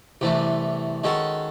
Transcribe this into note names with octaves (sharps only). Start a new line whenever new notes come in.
C2 C3 E3 A3
D#3 G#3 C#4 F#4 A4